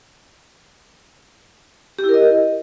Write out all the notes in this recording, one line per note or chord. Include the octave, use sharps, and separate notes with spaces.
G4
E4
A#4
D#5